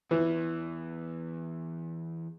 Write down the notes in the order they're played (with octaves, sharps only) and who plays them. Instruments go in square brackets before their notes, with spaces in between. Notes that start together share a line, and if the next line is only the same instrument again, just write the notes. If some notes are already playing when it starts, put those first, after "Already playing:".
[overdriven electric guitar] E2 [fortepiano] E3